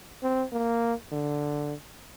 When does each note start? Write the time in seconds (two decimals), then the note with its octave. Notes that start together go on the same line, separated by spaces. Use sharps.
0.23 C4
0.52 A#3
1.12 D3